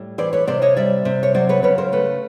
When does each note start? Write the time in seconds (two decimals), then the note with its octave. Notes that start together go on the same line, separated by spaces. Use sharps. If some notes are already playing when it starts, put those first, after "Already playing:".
Already playing: A2 G3
0.18 E3 C5 D5
0.33 B4 C#5
0.47 C3 C5 D5
0.62 C#5 D#5
0.76 G3 D5 E5
1.05 C3
1.23 C#5
1.34 F#3 C5 D5
1.49 B4 C#5
1.63 C#3 B4 C#5
1.78 A#4 C5
1.92 A3 B4 C#5